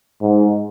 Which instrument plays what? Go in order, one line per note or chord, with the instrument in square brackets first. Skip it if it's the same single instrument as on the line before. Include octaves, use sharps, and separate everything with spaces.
[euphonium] G#2